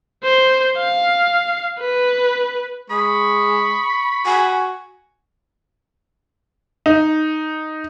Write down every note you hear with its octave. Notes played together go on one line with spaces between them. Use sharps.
C5
F5
B4
G#3 B5 C#6 D#6
F#4 G#5
D#4